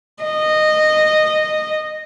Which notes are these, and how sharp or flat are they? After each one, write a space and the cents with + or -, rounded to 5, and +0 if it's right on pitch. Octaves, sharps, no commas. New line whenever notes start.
D#5 -15